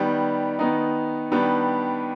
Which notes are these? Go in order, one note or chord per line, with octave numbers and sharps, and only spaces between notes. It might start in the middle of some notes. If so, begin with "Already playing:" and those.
Already playing: D#3 G3 B3
D#3 B3 D#4
D#3 G3 B3 D4